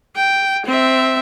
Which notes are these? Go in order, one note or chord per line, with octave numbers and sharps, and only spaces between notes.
G5
C4 E5